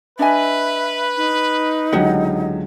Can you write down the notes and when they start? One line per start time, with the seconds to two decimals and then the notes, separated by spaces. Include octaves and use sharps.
0.19 D4 B4 D#5 E5 G#5
1.17 D#4
1.93 C#2 D3 F#3 G4 D#5 F#5